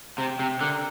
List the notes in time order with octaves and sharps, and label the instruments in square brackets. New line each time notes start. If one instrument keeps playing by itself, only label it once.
[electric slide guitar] C3 [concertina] G5
[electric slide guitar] C3
[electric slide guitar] D3 [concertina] A#4